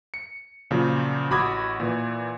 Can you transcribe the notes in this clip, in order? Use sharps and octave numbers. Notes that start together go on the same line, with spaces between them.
C#7
A#2 C#3 F3 F#3
A1 F#4 B5 D6 D#6 G#6
A#2 E3